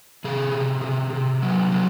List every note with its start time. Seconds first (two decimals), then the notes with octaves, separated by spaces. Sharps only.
0.24 C3 G#4
0.55 C3
0.84 C3
1.13 C3
1.42 F#3
1.72 F#3